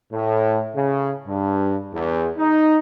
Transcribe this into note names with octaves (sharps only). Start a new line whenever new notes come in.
A2
C#3
G2
E2
D#4